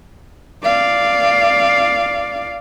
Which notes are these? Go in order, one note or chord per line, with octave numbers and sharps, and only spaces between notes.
D5 F5